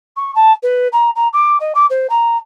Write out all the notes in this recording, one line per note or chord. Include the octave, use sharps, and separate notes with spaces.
C#6
A5
B4
A#5
A#5
D6
D#5
D6
C5
A#5